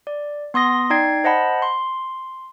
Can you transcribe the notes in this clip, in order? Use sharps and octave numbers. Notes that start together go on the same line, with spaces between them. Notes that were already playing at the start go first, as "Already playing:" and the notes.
D5
B3 C6 D#6 A#6
D#4 D5 G5 G#6 C7
C5 D#5 F#5 A5 B5
C6